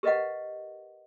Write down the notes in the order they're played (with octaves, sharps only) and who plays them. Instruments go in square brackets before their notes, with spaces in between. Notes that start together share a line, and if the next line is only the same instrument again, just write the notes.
[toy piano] G4 A#4 B4 D#5 F5 F#5